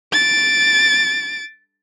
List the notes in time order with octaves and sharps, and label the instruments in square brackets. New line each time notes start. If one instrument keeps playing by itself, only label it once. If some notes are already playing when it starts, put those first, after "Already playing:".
[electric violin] A6 D7